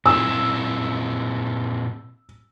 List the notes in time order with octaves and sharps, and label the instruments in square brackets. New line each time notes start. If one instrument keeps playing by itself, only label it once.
[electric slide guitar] A#2 C4 E4 [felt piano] E6